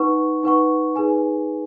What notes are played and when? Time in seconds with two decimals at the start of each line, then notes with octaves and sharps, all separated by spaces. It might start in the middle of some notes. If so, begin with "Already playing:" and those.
Already playing: D#4 B4 F#5 C#6
0.43 D#4 B4 F#5 C#6
0.96 D#4 G#4 B4 G#5